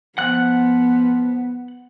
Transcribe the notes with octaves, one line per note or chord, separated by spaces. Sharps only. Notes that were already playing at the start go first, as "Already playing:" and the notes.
F3 B3 F#5 F#6